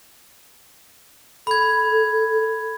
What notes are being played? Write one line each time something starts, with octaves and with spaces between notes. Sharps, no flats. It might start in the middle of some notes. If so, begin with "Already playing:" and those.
A4 B5 G#6